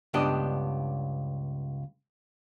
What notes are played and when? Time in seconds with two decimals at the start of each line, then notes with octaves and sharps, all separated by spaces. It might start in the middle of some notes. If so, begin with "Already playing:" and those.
0.14 C#2 G2 B3 D4 G4 D#5